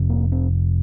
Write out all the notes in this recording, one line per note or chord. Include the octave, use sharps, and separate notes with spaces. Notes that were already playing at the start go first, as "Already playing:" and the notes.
Already playing: F1 F2 C3
A#3
C4